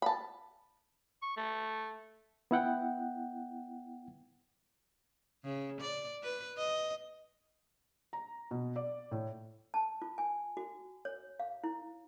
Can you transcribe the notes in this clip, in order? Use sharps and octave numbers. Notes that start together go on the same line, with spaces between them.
A5 B5
C#6
A3
B3 E4 F#5 G5
C#3
D5
B4
D#5
A#5
B2
D5
A2
A5
F4
G#5
F#4
C#5
F5
E4